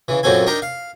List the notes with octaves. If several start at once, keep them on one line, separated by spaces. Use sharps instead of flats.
C#3 E3
F#2 A#2 F#3 C4 A4 G#5
D4 D#4 A#4 G5 A#5
F5